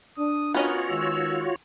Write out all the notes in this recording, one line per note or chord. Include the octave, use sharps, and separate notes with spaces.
D4 D#6
B3 C#4 F4 F#4 A#4 C#5 D#5
D#3 G#3 E6